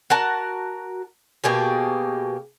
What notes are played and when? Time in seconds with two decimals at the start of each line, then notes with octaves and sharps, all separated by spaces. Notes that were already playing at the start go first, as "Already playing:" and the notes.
0.10 F#4 A#4 A5
1.44 B2 A#3 G4 G#4